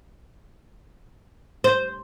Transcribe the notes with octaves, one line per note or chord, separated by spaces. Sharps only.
C5